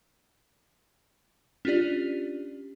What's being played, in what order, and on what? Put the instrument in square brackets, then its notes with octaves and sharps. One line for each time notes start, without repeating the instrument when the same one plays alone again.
[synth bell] C#4 D4 F4 G4 D5